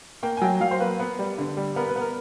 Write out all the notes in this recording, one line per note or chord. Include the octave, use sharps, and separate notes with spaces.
A#3 G5
G#5
F#3 G5
F#3 F5
C5
A#3 B4
B3
G3
D3
G3
B3 A#4
B4
B3
A#4